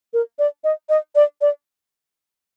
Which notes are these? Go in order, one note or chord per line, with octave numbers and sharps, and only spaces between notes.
A#4
D5
D#5
D#5
D5
D5